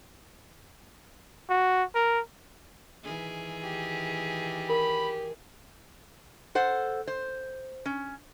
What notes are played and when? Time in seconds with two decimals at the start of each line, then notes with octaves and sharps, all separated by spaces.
1.50 F#4
1.95 A#4
3.04 D#3 E3 G#4
3.63 G4
4.69 A#4 B5
6.55 A4 C5 F#5
7.07 C5
7.86 C#4